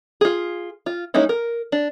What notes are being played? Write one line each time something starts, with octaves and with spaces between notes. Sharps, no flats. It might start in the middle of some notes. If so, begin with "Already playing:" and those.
F4 G#4
F4
G#3 A#3 C#4 D#4 E4
A#4
D4